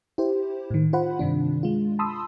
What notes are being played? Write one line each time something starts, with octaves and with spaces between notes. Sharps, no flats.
E4 G4 C5
A2 D#3
F4 C5 F#5 B5
G2 C3 D#3 D4
G#3 F4
A5 B5 C6 D#6 E6